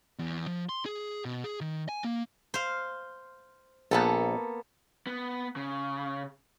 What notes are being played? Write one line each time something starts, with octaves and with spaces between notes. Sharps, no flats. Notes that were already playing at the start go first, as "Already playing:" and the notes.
E2
F3
C6
G#4
B2
G#4
D#3
G#5
A#3
C5 F5
A#1 A#3 B3 A4 A5
B3
C#3